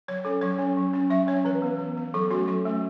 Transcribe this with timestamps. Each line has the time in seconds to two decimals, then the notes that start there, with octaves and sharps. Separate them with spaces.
0.08 F#3 C#5
0.25 C#4 A4
0.42 F#3 C#5
0.59 C#4
0.77 F#3
0.93 C#4
1.10 F#3 E5
1.27 C#4 C#5
1.45 E3 B4
1.62 B3
1.79 E3
1.97 B3
2.14 F#3 A4
2.30 A3 C#4 F#4
2.47 F#3 A4
2.66 A3 C#4